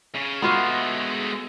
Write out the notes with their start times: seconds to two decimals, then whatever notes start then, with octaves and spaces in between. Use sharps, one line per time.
0.15 C#3
0.42 G#3 A3 B3 F4 F#4